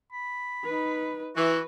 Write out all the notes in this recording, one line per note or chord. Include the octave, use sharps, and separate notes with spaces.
B5
D#4 B4
E3 F#4 B4